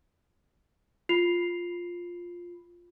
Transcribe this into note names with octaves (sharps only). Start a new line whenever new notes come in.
F4 B5 C7 F7